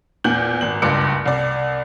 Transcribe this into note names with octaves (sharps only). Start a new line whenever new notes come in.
E2 A#2 G6 F#7
G#1 F#7
F#1 C#2 G2 D6 C#7
C2 D5